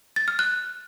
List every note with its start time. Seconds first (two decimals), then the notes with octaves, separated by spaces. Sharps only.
0.16 A6
0.28 F6
0.39 F#6